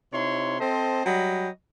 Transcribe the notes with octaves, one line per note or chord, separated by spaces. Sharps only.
C3 D#4 E4 C#5 C6
C4 A4 C5 D#5 A5
F#3 G3 D#5 G5 B5